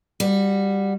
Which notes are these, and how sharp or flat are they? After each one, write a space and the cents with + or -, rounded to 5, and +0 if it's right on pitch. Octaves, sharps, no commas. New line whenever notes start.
G3 +10 F#4 -10